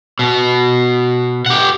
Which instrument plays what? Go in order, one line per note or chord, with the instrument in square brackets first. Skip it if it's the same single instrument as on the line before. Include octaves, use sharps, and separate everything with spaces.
[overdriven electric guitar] B2
G4 F#5